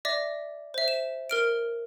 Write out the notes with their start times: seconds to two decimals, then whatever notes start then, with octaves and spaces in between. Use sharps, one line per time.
0.05 D5 E5 D6 A#6
0.74 C5 E5
0.88 E7
1.30 A#4 F6 D7